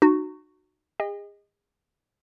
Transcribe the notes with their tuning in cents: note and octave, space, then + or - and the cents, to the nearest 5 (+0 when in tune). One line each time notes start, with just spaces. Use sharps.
D#4 -35 F#4 +0
G#4 -35 D#5 +0 G5 +45